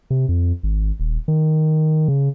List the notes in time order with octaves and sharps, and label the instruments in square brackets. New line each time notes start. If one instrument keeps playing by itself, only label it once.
[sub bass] C3
F2
G#1
D#1
D#3
C#3